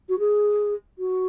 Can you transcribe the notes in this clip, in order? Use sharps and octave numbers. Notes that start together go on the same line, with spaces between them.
F#4
G#4
F#4